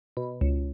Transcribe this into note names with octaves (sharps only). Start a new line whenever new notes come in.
B2
C#2